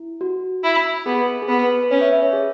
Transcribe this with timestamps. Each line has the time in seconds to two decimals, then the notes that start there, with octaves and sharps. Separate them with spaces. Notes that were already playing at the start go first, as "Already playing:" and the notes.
Already playing: E4
0.21 F#4
0.64 E4
1.06 B3 G#4
1.42 G#4
1.48 B3 B4
1.83 B4
1.91 C#4 C#5
2.01 E5
2.12 E5
2.23 C#5
2.33 G#4